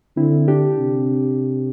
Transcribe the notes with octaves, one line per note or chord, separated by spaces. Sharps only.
D3 C4 E4
D4 G4
C3